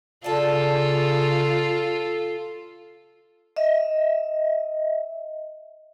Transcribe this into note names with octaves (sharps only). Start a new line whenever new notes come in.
C#3 F4 A4 D5 A5
D#5 E5